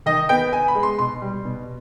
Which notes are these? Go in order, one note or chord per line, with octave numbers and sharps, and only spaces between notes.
D#3 D#5
B3 G5
B3 G#5
B5
G#3
C6
B2 C6
G3
B2